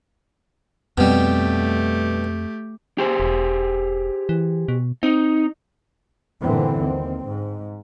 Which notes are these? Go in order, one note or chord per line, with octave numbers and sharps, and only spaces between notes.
F2 B2 G3 A3 C4 G4
G4 G#4 C5
E1
E3
B2
C4 D#4
G1 A#2 D3 E3 C4
D#2 C4
G#2